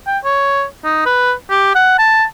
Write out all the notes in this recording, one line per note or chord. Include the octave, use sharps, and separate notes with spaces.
G5
C#5
D#4
B4
G4
F#5
A5